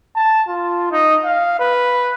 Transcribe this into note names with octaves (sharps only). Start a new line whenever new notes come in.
A5
F4
D#4
F5
B4